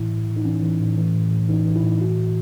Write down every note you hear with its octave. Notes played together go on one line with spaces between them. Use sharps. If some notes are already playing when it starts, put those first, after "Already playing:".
Already playing: A2 E3 E4
A2
A2
D#4
E3 C#4
E3
A2
E3
A2
A2
E3 D#4
E3
E4
A2
E3 F#4
A2